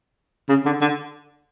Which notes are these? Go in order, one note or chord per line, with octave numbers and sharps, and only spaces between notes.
C#3
D3
D3